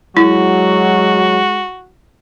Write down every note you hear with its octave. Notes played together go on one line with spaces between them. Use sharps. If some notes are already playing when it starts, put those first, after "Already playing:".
F#3 G#3 E4 F#4